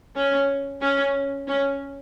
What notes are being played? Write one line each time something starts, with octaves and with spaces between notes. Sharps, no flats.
C#4
C#4
C#4